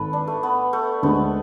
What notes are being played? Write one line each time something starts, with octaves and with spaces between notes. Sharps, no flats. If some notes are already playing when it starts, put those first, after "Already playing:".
Already playing: G#1 A4 B4
D4
A3
B3
A3
D2 D3 G#3 B3